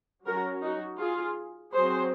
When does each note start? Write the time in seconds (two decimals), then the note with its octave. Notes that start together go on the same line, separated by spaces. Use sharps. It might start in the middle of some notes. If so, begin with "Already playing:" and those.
0.26 F#3 C#4 F#4 A#4
0.62 D#4 F#4
0.99 F4 G#4
1.73 F#3 G#4 C5
1.78 C4